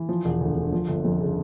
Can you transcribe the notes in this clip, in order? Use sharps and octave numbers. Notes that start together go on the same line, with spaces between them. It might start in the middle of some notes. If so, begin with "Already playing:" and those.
Already playing: E3
F3
E1
D2
D3
F3
G1
F2
C#3